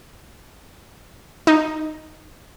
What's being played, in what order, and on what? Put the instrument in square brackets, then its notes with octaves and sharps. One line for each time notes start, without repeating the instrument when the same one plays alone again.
[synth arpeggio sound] D#4